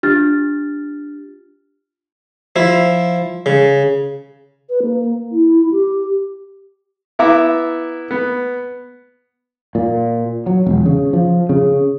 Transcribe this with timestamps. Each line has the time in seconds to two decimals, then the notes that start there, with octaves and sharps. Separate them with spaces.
0.03 D4 F4 G4 F6 A6
2.56 F3 E4
3.46 C#3
4.70 B4
4.83 A#3
5.32 E4
5.71 G4
7.19 B3 E4 E5 A#5 D6
8.11 B3
9.75 A#2
10.46 F#3
10.67 E1
10.86 C#3
11.13 F3
11.49 C#3